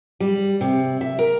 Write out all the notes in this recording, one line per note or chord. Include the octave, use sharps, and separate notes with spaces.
G3
C3
E5
A#4